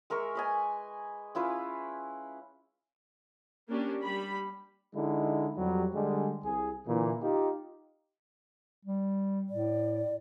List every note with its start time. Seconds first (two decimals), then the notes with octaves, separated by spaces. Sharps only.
0.10 G#3 A#4 E5 C#6
0.35 B4 D#5 G#5
1.35 C#4 E4 F4 B4
3.68 A#3 C#4 D4 G4
4.02 G3 B5
4.95 D3 G#3 D#4 E4
5.58 F2 F#3 G3
5.95 D3 G3 G#3
6.44 C2 G#4
6.87 A#2 D3 E3
7.22 D#4 F4 G4
8.85 G3
9.49 A2 D5